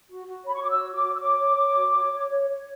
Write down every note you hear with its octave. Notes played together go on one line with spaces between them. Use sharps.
F#4
F#4
C#5 B5
C#6
F#4 D6
E6
C#5
D6
F#4
E6
C#5 D6
C#5
C#5
F#4
C#5
C#5
C#5
C#5